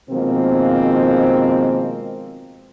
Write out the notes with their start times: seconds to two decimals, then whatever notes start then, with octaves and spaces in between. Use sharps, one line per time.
0.10 B2 D#3 F3 G#3 A#3 C4